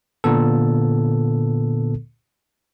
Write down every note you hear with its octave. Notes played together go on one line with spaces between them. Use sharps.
A#2 D3 B3 A4